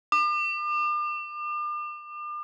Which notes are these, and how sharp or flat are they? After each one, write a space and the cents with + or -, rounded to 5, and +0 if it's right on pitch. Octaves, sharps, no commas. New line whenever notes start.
D6 +40